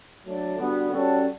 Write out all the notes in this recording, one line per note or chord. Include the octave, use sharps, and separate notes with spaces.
F#3 A3 D4
D3 G3 B3 F#4
G3 C#4 F#4 A4 C#5